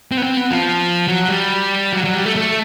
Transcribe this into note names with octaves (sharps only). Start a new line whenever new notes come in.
C4
B3
C4
B3
F3
F#3
G3
F#3
F#3
G3
A3
A3